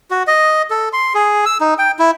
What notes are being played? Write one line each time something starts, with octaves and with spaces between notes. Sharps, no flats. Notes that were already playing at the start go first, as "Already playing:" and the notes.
F#4
D#5
A4
C6
G#4
E6
D#4
G5
E4